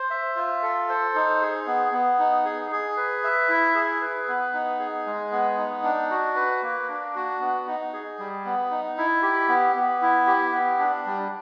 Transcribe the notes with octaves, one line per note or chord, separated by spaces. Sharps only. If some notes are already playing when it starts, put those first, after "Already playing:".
Already playing: C5
E5
F4
A4
C5
D#4
G#4
B3
B3
D#4
G#4
G#4
B4
E5
E4
G#4
B4
B3
D#4
G#4
G#3
B3
D#4
D4
F#4
B4
A#3
D4
F#4
B3
D#4
G#4
G3
B3
D#4
E4
G4
B3
B3
E4
G4
B3
D4
G3